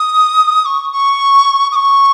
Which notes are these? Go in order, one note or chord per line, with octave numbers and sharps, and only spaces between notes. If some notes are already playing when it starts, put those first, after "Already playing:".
Already playing: D#6
C#6
C#6
D#6
C#6